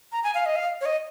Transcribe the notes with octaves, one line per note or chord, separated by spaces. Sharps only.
A#5
G#5
F5
D#5
F5
C#5
D#5